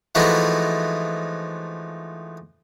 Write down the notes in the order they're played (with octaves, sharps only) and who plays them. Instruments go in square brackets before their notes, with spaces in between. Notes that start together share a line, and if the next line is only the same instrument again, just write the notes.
[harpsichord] E3 F3 G#3 A3 D#4 F#4